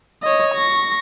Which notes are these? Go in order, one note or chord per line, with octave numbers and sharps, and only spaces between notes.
C#5 D#5
C#6 A#6